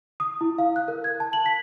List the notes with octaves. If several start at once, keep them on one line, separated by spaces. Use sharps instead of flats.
D#6
E4
F5
F#6
A#4
G#6
A5
F#7
B6